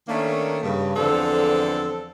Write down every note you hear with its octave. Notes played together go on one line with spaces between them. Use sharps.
D#3 A3 A#3 C#4 D4
G2 C#3
E2 D3 F3 C4 A4